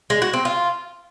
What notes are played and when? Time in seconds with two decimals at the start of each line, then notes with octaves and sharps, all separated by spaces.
0.10 G#3
0.22 F#4
0.33 C4
0.45 F4